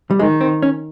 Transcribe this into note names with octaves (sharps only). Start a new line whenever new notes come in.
G3
D#3 G#3
C4
C#4